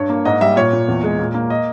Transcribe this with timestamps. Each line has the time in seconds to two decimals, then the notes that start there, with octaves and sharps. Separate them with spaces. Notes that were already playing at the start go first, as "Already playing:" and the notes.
Already playing: G2 C#5
0.10 A#3
0.25 G#2 D#5
0.41 G3 E5
0.56 A#2 C#5
0.73 A#2
0.88 E2
1.04 G#3
1.19 A#2
1.34 A#3
1.50 D#5